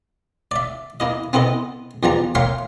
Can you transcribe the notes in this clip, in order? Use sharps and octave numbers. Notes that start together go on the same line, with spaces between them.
D5 E5
A#3 E4 D#5
B3 C4 E4 A4 D#5
E2 F3 G3 A5 A#5
A#4 C#5 E5 F5 G5 C6